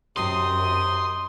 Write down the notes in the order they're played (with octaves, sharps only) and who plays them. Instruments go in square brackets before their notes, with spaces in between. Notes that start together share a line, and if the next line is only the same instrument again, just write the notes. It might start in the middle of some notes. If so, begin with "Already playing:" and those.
[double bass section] F#2 [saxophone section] C3 D#4 G4 [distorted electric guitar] C6 [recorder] D#6